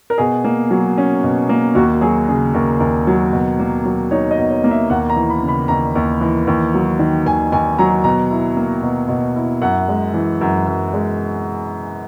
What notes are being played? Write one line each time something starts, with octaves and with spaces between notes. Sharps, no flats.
A#4
B2 G#4
A#3
F#3
C#4
B2
A#3
D#2 F#4
F#3 G#4
C#3 G#4
D#2 A#4
D#2
F#3
B2
A#3
F#3
D#4 C#5
D#5
B2
C#5
A#3
E5
D#2 F#5
A#5
E3
B5
C#3
B5
D#2 A#5
D#2
E3
D#2
F#3
D#3
D#2 G#5
D#2 G#5
F#3 A#5
B2 A#5
E4
A#3
B2
B2
E4
F#2 F#5
G#3
E3
F#2
F#2
G#3